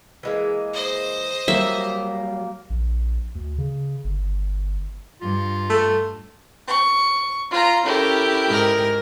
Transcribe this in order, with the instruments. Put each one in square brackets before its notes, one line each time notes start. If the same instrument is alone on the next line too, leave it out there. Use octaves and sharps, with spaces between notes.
[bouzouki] E3 G#3 A#3
[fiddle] C5 D#5
[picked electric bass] F#3 G3 [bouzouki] A#3 [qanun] E5
[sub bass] A#1
D2
C#3
G1
[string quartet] G2 [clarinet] F4
[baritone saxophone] A3
[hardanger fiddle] C#6
F4 A#5
[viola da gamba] C#4 A4 A#4 [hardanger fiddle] E4 G4
[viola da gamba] G#2 A#4